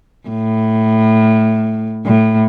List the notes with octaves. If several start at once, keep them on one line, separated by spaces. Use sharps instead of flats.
A2
A2